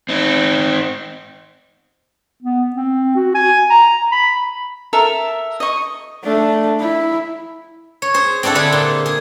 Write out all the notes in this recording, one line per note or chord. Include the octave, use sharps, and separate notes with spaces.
C4 D#4
B3
C4
F#4
G#5
A#5
B5
A4 A#4 E5
D#5 C#6
A3 D4
E4
C#5
G#4 C5
C4 D4 E4 A4 F#5
D3 D4 G#4 C5 B5
A#2 C6
G#4